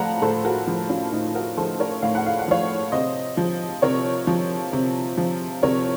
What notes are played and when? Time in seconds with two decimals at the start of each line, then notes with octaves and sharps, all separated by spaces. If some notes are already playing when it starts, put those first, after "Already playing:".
Already playing: A2 F3 F5 F#5 A5 A#5
0.22 A2 A4 C5
0.45 F#4 A#4
0.67 F3
0.89 C#4 F4
1.12 A2 D#4
1.35 F#4 A#4
1.57 F3 A4 C5
1.80 A#4 C#5
2.02 A2 F5
2.15 F#5
2.26 F5
2.39 F#5
2.48 F3 C#5 F5
2.92 C3 C5 D#5
3.37 F3
3.82 C3 A#4 C#5
4.27 F3
4.73 C3
5.18 F3
5.63 C3 A#4 C#5